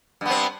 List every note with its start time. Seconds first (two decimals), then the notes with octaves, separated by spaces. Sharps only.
0.21 G2
0.26 B3
0.30 C4